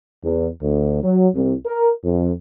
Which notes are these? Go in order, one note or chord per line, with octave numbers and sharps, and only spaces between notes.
E2
D2
F#3
C2
A#4
F2